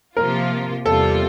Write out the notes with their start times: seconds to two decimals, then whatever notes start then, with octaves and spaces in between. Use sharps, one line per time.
0.17 C3 F3 A#3 F4 A#4
0.86 E2 C3 G3 A#3 F4 A4